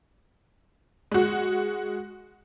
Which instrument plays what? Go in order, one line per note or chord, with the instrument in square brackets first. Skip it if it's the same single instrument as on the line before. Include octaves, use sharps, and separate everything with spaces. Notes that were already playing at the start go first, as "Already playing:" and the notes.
[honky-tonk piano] G#3 F#4